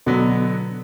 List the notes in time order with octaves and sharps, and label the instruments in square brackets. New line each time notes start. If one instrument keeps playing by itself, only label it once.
[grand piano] B2 [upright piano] D3 F#3 B3